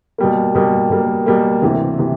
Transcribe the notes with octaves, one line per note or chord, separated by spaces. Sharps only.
B2 G3 A#3
B2 G3 A#3
B2 G3 A#3
B2 G3 A#3
D2 C3 E3
C3 E3